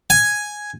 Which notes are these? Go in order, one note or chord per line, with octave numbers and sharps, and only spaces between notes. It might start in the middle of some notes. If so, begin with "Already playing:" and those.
G#5